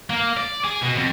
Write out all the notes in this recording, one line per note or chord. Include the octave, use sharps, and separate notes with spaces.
A#3
D5
G#4
B2
F2